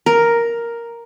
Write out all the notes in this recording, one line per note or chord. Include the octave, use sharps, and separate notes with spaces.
A#4